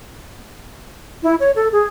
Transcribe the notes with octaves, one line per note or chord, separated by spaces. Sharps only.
E4
C#5
A4
G#4